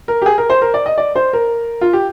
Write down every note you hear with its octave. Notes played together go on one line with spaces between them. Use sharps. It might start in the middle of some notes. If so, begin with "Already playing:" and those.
A#4
G4
G#4
A#4
C5
A#4
D5
D#5
D5
C5
A#4
F4
G4